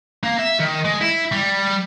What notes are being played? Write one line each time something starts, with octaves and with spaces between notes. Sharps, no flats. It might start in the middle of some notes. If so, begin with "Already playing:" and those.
A#3
E5
D#3
G#3
E4
G3